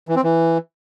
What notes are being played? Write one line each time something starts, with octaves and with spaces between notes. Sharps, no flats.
E3
C4
E3